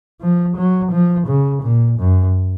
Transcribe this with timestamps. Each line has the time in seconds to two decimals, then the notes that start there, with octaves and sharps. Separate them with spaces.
0.21 F3
0.57 F#3
0.92 F3
1.27 C#3
1.63 A#2
1.99 F#2